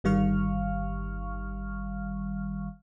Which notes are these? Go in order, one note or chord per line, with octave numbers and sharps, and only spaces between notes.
G1 D#3 G3 F5 C#6 F6